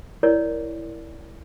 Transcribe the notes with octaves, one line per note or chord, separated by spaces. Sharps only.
E4 A#4 C#5 D5